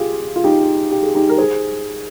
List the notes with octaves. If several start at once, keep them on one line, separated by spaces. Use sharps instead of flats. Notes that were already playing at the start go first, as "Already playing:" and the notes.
Already playing: F4 G4 G#4
F4
D#4 G4
G4
G#4
D#4 G4
A#4
G#4 C5